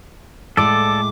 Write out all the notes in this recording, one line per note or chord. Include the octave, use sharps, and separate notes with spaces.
A2 G#3 A4 D5 D6